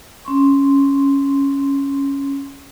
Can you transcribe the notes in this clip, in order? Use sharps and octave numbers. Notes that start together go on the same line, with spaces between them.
C#4 C6 C#6